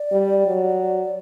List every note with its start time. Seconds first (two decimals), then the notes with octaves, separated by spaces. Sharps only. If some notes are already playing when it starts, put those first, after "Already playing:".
Already playing: D5
0.12 G3
0.46 F#3